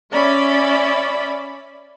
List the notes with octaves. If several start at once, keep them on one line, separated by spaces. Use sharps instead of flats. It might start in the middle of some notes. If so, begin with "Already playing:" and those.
C#4 D5 E5 B5